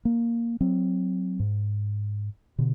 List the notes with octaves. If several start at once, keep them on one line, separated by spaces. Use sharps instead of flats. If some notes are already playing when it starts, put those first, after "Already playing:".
A#3
F#3 C4
G#2
B2 D3